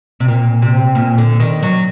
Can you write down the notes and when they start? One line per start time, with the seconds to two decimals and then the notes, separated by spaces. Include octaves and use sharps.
0.20 C3
0.28 A#2
0.62 C3
0.95 A#2
1.18 D3
1.40 D#3
1.63 F#3